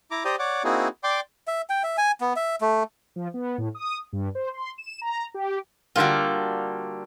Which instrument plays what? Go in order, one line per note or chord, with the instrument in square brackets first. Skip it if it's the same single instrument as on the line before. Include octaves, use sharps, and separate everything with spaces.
[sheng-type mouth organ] E4 A#5 D6
G4 C5 D5 G5 A#5 D#6
C#5 D5 F#5 D6
A#3 C4 D#4 E4 F#4 G#4
D5 G5 C6 D6
[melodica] E5
G5
E5
G#5
B3
E5
A3
[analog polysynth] F3
B3
A2
D#6
G2
C5
C6
E7
A#5
G4
[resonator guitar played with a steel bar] D3 G3 A#3 [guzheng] F4 F#4